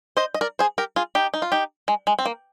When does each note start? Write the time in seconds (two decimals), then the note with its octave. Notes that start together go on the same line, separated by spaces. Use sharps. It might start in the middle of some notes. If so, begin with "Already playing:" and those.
0.17 C5 D#5
0.34 D#5
0.41 A#4 D5
0.59 G#4 C5
0.78 G4 A#4
0.96 F4 G#4
1.15 D#4 G4
1.34 D#4
1.42 F4
1.52 D#4 G4
1.88 G#3
2.07 G#3
2.19 C4
2.26 A#3